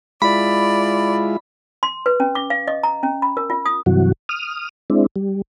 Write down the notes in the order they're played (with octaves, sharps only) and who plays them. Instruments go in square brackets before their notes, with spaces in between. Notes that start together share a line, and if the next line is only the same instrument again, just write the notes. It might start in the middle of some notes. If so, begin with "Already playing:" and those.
[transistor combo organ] G#3 E4 F4 [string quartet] D5 [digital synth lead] B5
[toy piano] C6
B4
C#4
D6
F5
D#5
A#5
C#4
B5
A#4
F4
D#6
[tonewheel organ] G2 C3 E3 F#3 F#4
D#6 F6
G#3 C4 D4 E4
G3